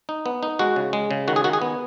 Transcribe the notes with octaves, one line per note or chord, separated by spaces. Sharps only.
D#4
B3
D#4
G#3 F#4
C#3
G#3
C#3
D#3 F#4
G#4
D#3 F#4
G#4
B3